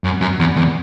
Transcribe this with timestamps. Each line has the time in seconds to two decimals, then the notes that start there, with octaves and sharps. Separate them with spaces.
0.04 F#2
0.21 F#2
0.39 E2
0.56 E2